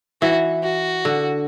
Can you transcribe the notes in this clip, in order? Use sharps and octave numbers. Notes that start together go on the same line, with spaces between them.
E3 F#4
F#4
D3